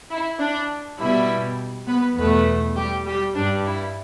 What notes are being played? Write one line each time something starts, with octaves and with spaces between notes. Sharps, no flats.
E4
D4
B2 G3 E4
B3 B4
E2 B2 A3 B3 B4
G3 G4
G3 G4
G2 G3 D4
E4